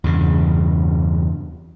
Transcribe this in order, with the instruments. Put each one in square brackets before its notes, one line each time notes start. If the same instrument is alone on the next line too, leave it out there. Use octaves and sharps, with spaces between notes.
[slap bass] E2 G2 C#3